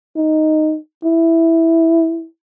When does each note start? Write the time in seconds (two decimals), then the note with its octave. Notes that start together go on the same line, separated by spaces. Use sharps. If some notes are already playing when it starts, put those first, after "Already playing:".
0.16 D#4
1.04 E4